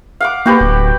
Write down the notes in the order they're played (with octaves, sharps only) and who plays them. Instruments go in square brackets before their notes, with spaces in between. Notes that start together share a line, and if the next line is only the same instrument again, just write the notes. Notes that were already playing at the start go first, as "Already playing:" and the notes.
[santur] F5 F#5 D6
[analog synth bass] A#3 [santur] F#4 G4 B4
[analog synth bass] D1